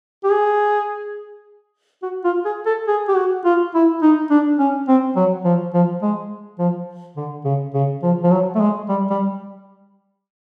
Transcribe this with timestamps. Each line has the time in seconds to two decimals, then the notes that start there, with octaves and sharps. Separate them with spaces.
0.24 G4
0.31 G#4
2.02 F#4
2.24 F4
2.45 G#4
2.66 A4
2.88 G#4
3.08 G4
3.16 F#4
3.45 F4
3.74 E4
4.02 D#4
4.30 D4
4.59 C#4
4.88 C4
5.16 F#3
5.45 F3
5.74 F3
6.02 G#3
6.59 F3
7.16 D3
7.45 C#3
7.74 C#3
8.03 F3
8.24 F3
8.31 F#3
8.55 A3
8.60 G#3
8.89 G3
9.10 G3